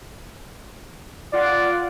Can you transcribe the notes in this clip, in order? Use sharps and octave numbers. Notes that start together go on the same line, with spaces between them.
F4 D5 F#5